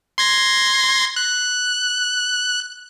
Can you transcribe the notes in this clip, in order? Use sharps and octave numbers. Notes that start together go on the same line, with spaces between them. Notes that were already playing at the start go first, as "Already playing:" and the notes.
C6 G#6 A#6
F#6